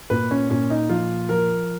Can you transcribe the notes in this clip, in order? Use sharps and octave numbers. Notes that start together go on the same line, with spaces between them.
A#2 B4
C#4
A#2 C#4
D#4
F3 F4
F3 A#4